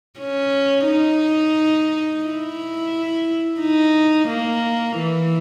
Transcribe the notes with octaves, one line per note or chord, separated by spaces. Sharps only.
C#4
D#4
E4
D#4
A#3
E3